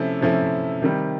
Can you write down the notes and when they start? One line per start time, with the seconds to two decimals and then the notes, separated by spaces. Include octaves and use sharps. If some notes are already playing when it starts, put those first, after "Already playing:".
Already playing: C3 F3 A3 C#4 E4
0.21 C3 F3 A3 C#4 E4
0.82 C3 D#3 G3